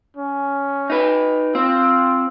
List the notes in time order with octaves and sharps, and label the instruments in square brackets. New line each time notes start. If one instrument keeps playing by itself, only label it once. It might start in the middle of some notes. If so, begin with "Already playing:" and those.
[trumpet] C#4
[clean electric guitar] D#4 B4
[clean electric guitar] C4 [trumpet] F4